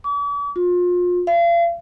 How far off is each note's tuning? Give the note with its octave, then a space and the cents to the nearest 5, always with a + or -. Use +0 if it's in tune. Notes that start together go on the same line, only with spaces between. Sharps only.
D6 -45
F4 +30
F5 -40